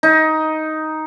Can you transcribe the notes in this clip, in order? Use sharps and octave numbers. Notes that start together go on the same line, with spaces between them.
D#4